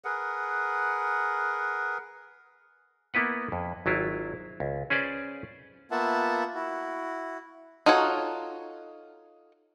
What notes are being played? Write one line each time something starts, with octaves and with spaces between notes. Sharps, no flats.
G#4 A#4 B4 F#5
A#3 B3 E4 B4 F#5
F2
G#1 F#3 E4 F4
C#2
C#4 G#4 B4 C5 D5
A#3 B3 F4 E5 F#5 A5
E4 F#4
D#4 F4 F#4 A4 C#5